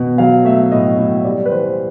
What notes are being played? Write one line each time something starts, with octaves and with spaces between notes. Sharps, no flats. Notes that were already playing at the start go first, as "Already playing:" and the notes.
Already playing: B2
F#3 F5
A3 E5
A2 D#5
A2
G3 D5
B4
E3 C5